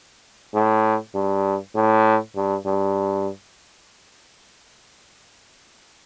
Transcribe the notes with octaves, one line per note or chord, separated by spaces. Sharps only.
A2
G2
A2
G2
G2